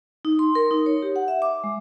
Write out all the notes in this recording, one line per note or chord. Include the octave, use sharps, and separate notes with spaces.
D#4
C6
A#4
D#4
C#5
G4
F#5
E5
D6
G#3